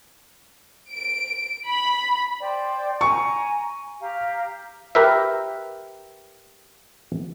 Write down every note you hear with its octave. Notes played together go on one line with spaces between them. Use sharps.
D7
B5
C5 D5 G5
G#5 A#5 C#6
G4 F5 A#5
G4 A#4 B4 E5